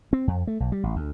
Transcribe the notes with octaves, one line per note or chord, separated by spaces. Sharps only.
C4
F2
A3
B1
G3
A1
D2